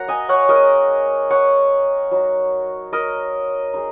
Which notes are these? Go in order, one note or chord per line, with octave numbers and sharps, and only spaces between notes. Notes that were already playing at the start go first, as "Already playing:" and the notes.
Already playing: F#3 A#3 F#5 A#5
D#5 G#5
C#5 F#5
G#3 D#4 A#4 D#5
C#5 F#5
F#3 D#4
A#4 D#5
G#3 D#4